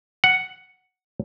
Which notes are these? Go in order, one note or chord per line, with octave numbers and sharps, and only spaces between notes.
F#5